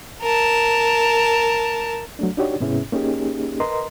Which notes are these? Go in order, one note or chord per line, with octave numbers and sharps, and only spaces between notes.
A#4 A5
F#3 A3 D4
D4 D#4 F#4 G4 C#5 D5
G#2 C3 B3 C#4 E4 G#4
A#3 C#4 D#4 G4 G#4
A#4 B4 D#5 A#5 C6